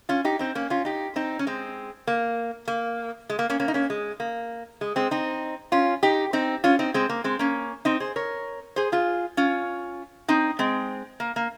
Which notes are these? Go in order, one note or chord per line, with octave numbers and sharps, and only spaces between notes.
C#4 F4
D#4 G4
C4 D#4
A#3 C#4
C#4 F4
D#4 G4
C4 D#4
C#4
G#3 C4
A#3
A#3
G#3
A#3
A#3 C#4
A#3 C#4
D#4
A#3 C#4
G#3
A#3
G#3
G#3 C4
C4 D#4
C#4 F4
D#4 G4
C4 D#4
C#4 F4
C4 D#4
G#3 C4
A#3
G#3 C4
A#3 C#4
C4 D#4
G#4 C5
A#4 C#5
G#4 C5
F4 G#4
C#4 F4
C4 D#4
G#3 C4
A#3
A#3